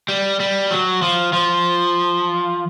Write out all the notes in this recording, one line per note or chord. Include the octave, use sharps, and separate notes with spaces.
G3
G3
F#3
F3
F3